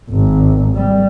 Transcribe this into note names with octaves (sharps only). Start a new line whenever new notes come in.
G#1
G3